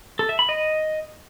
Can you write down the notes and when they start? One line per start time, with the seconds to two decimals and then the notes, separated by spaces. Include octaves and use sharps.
0.19 A4
0.29 E5
0.39 B5
0.49 D#5